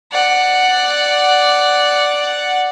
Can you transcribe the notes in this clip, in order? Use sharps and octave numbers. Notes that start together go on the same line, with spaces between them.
D5 F#5